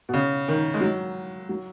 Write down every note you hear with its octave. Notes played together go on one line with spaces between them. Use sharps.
B2
C#3
D#3
G#3
F#3
F#3